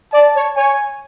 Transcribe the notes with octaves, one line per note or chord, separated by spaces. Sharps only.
D5 A5
C#5
C#5 G#5